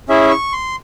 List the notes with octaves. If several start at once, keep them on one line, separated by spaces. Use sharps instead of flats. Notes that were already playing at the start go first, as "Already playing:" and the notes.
C#4 E4 G#4 E5
C#6
C6